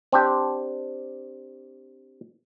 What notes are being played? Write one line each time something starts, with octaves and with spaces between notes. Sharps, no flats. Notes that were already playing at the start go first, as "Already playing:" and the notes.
C4 D4 G4